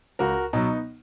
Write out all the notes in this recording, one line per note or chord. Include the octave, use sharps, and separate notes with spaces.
C#2 F#4 A#4
B2 F#3 B3 D#4